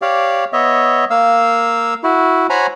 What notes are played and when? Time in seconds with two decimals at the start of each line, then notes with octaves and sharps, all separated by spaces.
0.02 G4 C#5 D5 F5
0.53 B3 C#5 D#5 E5
1.10 A#3 F5 E6
2.03 E4 F#4
2.50 C5 C#5 F#5 G#5 A#5 B5